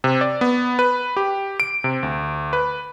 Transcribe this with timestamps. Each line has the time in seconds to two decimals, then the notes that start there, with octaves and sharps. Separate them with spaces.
0.04 C3
0.21 D5
0.41 B3
0.79 B4
1.17 G4
1.60 D7
1.84 C3
2.03 D2
2.53 B4